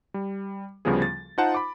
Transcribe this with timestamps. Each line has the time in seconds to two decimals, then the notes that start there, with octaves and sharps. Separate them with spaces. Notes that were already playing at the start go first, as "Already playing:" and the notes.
0.14 G3
0.85 D2 C#3 F3 G3 B3 G#4
1.02 A6
1.38 D#4 F4 C5 F#5 A5
1.54 B5 D6